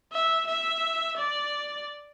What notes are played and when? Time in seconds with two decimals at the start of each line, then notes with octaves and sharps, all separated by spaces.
0.12 E5
0.47 E5
1.17 D5